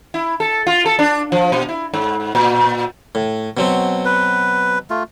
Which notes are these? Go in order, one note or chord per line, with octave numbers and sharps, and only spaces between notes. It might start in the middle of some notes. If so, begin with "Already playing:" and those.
E4
A4
F4
A4
D4
F3
B2
E4
G#2
A#2
A2
B2 F#3 C4
B4
A3 F4